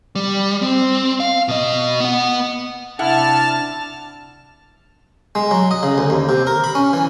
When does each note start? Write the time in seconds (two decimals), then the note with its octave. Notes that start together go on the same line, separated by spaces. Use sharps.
0.15 G3
0.62 C4
1.20 F5
1.48 B2 D#5
2.00 B3 F#5
2.99 C3 D4 E4 F#5 A5 F6
5.35 G#3
5.51 F#3
5.71 D#5
5.83 C#3
5.98 D2
6.10 D#2
6.29 C3
6.47 A#4
6.64 B5
6.75 C#4
6.93 E3